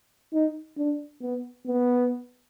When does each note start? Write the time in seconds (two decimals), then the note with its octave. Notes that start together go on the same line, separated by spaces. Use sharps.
0.33 D#4
0.78 D4
1.22 B3
1.67 B3